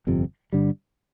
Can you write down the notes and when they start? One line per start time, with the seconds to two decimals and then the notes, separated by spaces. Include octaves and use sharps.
0.07 G1 F2 C3
0.52 G2 D3 G3